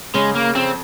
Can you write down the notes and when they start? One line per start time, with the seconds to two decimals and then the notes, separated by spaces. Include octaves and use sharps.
0.14 C#3 G#3
0.35 A#3
0.55 F2 C4